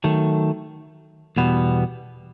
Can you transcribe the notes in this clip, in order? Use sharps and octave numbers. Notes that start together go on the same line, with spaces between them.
D#3 F#3 A3
E2 B2 G3 B3